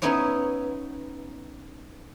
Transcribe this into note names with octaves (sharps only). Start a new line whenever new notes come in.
B3 C#4 D#4 E4 C#5